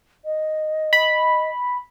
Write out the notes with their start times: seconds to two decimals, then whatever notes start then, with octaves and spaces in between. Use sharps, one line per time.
0.25 D#5
0.93 B5